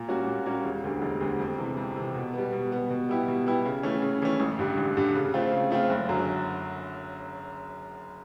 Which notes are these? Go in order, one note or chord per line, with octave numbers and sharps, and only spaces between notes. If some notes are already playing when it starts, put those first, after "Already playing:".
Already playing: A#2
G3 A#3 C#4 F#4
A#2
G3 A#3 C#4 F#4
E1
D2 D3 G3
E1
D2 D3 G3
F2
C3 E3
F2
C3 E3
B2
G3 B3
B2
G3 B3
B2
G3 B3 E4 G4
B2
G3 B3 E4 G4
C#3
E3 A3 C#4
C#3
E3 A3 C#4
A1
G2 D3 G3
A1
G2 D3 G3
C#3
F3 A3 C4 F4
C#3
F3 A3 C4 F4
F#1
F#2 D3 F#3